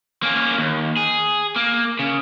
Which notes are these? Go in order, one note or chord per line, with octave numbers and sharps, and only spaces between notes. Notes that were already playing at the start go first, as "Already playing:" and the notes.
A#3 C#4
D#2
G#4
A#3
C#3